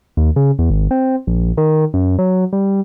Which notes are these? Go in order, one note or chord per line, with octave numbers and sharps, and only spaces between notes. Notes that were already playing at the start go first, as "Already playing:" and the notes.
D#2
C#3
E2
G#1
C4
A#1
D#3
F#2
F#3
G3